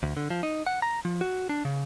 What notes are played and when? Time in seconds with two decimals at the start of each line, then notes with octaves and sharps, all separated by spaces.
0.03 D2
0.17 D3
0.30 F3
0.43 D#4
0.67 F#5
0.82 A#5
1.05 F3
1.21 F#4
1.49 D4
1.65 C#3